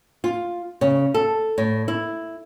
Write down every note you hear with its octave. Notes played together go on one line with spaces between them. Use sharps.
F4
C#3
A4
A2
E4